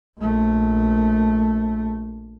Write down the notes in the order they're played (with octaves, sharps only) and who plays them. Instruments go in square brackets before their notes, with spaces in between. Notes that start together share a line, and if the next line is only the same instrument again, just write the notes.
[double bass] A#1 A3